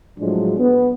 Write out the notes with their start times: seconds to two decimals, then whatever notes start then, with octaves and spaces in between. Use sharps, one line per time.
0.20 A2 F3 F#3 G#3 D4
0.58 B3